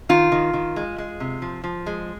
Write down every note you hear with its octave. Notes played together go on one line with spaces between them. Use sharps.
D#3 F4
D#3
D#3
G#3
G#3
C3
F3
F3
G#3